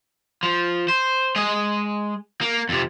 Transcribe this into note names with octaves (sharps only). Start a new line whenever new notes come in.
F3
C5
G#3 D#5
A#3
F2 C3